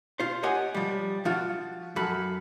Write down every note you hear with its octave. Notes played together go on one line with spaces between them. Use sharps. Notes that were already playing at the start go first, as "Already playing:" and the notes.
F4 C5
G4 C#5 D#5 F#5 G#5
F3 G3
F3 F4 F#4
F#2 A4 B5